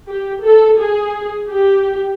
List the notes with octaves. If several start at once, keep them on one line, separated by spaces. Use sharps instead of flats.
G4
A4
G#4
G4